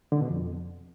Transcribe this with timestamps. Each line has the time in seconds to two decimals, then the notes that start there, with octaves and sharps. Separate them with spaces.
0.12 D3
0.21 B2
0.31 F2